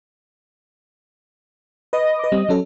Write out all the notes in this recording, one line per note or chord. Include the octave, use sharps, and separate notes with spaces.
B4 D#5
B4 D6
G3 C4
F#3 C#4 A4